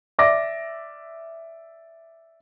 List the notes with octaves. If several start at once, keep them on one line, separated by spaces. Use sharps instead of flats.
D5 E5 D6 A#6